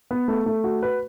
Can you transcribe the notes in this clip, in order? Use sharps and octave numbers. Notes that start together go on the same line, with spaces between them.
B3
A3
A3
F#4
B4